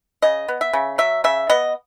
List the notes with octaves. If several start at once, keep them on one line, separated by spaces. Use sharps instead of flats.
C#3 D#5
B3
E5
C#3
F#3 E5
C#3 E5
B3 D#5